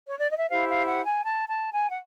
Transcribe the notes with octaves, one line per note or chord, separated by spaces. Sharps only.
C#5
D5
D#5
E5
E4 G4 C5 F5
F5
F#5
G#5
A5
A5
G#5
F#5